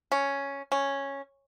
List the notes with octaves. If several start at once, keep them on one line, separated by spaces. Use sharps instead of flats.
C#4
C#4